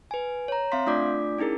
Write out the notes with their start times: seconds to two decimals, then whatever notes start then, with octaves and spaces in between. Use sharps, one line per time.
0.11 B4 G#5
0.48 C#5 A#5
0.72 C4 E5 F5 C6 B6
0.86 A3 D4 F4 D5 D6 B6
1.38 C#4 D#4 E4 G#4 A#4